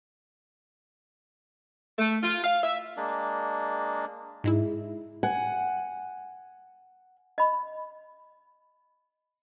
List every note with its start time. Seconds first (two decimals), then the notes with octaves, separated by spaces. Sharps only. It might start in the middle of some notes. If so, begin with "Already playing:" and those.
1.99 A3
2.23 F4
2.44 F5
2.63 E5
2.97 G#3 A#3 D4
4.44 G#2 G#3 E4
5.23 F#5 G#5
7.38 D#5 B5